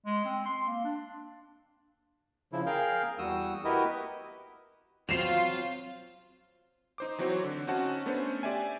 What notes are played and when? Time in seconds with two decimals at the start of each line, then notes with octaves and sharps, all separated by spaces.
0.06 G#3
0.25 C4
0.46 C6
0.67 A#3
0.84 D4
2.52 C#3 F3 E4
2.66 G#4 A#4 F5 G5
3.19 E2 G3 F#4 D#6 E6
3.64 E4 F#4 G4 A#4 B4 D#5
5.09 F#3 C4 F4 C7 E7 F7
6.98 D#4 C5 D6
7.18 E3 F#3 C4 F#4 C5 C#5
7.44 D3
7.67 C4 C#4 D#4 F#4 F#5 A5
8.06 A3 B3 C#4 D4 C5
8.43 G4 D5 E5 G#5